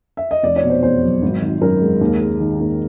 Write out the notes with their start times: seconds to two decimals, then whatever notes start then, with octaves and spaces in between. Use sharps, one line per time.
0.17 E5
0.31 D#5
0.43 F1 D5
0.56 C#5
0.63 B2
0.70 C5
0.83 E2 C5
1.03 F#3
1.22 G#1
1.42 D#3
1.61 F#2 A#4
1.81 G#3
2.01 D#2
2.21 G#3
2.40 D#3
2.60 D#2